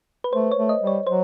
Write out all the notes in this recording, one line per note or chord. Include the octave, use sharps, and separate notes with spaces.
B4
A3 C5
C#5
A3
D#5
G3
C#5
F#3 C5